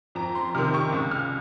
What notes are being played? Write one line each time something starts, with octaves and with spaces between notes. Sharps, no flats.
F2 A#5
C6
C3 D#3 F6
C#6
C#2
F6